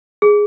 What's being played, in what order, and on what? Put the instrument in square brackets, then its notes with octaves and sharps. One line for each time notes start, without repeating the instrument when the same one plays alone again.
[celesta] G#4